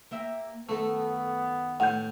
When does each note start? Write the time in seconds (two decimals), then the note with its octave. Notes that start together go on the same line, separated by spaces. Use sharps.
0.11 A#3 G4 E5
0.69 F#2 D#3 A3 B3 A4
1.80 A2 F#5 G6